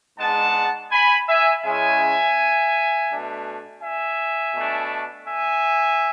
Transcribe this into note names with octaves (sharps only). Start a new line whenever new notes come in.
G#2 G#3 B3 D4 F#5 A5
G#5 B5
E5 G#5
C#3 G#3 C#4 E4 E5 G#5
B2 A3 D4
E5 G#5
B2 A3 D4
E5 G#5